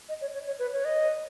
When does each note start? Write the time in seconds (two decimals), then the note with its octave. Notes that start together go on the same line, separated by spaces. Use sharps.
0.09 D#5
0.21 C#5
0.34 C#5
0.47 C#5
0.59 B4
0.73 C#5
0.85 D#5